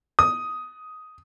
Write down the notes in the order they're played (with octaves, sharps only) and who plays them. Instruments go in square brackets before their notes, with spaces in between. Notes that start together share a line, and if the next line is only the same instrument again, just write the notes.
[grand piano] D#6